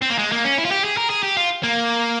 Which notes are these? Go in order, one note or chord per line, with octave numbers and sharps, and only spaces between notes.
C4
A#3
G#3
A#3
C#4
E4
F4
G4
G#4
A#4
G#4
G4
F4
A#3